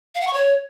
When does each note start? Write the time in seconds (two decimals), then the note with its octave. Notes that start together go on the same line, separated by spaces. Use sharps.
0.15 F5
0.21 F#5
0.27 C#6
0.33 C#5